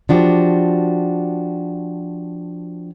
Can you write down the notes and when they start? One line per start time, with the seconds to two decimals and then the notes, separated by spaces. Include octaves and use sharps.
0.09 F3 D4 F#4 G4